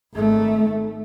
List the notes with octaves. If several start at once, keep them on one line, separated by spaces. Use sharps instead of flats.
G#1 A3